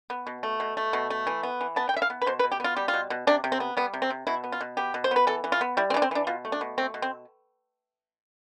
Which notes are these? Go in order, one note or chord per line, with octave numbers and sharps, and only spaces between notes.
B3
B2
A3
B2
A3
B2
A3
E3
B3
E3
B3 A5
G5
E3 E5
F5
B3
B4
B2 C5
B4
B2
G4
B3 F4
G3 G4
F4
B2
B2
C3 D4
C3
C4
B3
G3 B3
C3
C4
C3
B2 E4
B3
F4
B2
B3 G4
B2
C5
B3 B4
E3 A4
E3
F4
B3
G3 E4
C4
E3 D4
C4
E3 D4
B2 F4
A3
D4
B2
A3 C4
B2
C4